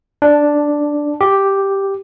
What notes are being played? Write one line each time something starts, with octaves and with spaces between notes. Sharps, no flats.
D4
G4